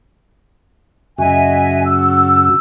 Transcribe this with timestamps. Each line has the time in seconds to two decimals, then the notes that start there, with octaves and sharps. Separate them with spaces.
1.18 F#2 C#3 F#4 D#5 E5 G#5
1.85 E6